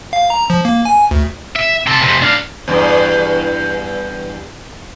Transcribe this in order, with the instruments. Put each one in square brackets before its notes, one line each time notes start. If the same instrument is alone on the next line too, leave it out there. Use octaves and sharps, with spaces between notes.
[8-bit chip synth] F5
A#5
F3
A#3
G#5
D2
[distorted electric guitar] E5
C3 A4
F2 C3
D4 F5
[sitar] E2 G2